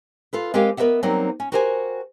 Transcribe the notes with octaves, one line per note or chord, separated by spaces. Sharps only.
F4 A4 B4
G#3 C4 G4 A#4 F5 G#5
B3 A#4 C5 D#5 E5 F#5
F#3 G3 A#3 C4 D#4
C#4
F#4 G4 A#4 C5 D#5 G#5